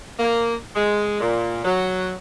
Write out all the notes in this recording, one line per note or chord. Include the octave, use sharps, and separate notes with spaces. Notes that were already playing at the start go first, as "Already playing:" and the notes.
A#3
G#3
A#2
F#3